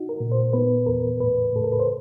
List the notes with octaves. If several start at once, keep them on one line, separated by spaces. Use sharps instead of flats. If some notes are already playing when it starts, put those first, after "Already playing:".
Already playing: D#4 F#4
A#4
A#2
C5
B3 B4
E2 A#4
A2 B4
A2 A4
A#4
B4
C5